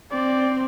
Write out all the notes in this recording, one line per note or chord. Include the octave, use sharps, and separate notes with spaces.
C4 D5